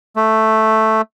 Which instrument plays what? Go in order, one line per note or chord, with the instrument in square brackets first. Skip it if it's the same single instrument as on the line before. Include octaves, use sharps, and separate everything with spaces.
[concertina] A3